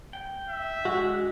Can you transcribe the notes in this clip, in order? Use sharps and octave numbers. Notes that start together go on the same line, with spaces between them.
G5
E5
G#3 D4 F#4